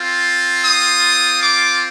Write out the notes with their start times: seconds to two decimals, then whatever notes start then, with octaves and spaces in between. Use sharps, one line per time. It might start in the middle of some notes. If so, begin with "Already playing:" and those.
Already playing: C4 F4
0.65 D#6
1.43 D6